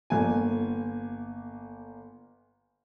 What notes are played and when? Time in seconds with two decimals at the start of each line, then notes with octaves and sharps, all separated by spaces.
0.10 G1 A#3 G#5